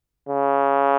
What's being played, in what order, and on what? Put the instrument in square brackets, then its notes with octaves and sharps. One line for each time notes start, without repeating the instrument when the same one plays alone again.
[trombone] C#3